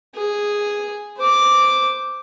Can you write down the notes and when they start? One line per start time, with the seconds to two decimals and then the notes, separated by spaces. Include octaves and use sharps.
0.15 G#4
1.17 C5 D6